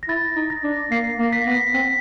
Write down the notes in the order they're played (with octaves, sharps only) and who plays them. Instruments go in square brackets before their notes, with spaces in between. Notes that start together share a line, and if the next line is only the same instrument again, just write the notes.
[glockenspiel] A#6
[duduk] E4 [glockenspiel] A6
[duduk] D#4
[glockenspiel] A#6
[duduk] D4
[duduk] A#3 [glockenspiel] C7
[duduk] A#3
[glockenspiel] A#6
B6
[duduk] B3
[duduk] C4 [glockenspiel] B6